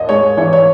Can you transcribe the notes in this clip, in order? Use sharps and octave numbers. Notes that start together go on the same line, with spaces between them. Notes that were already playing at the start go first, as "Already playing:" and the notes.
Already playing: D#2 D#5
G#3 C#5
E3 C#5
C#5